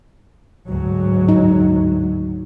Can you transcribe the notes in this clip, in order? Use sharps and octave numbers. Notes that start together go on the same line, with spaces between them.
D2 G#2 F#3
D#4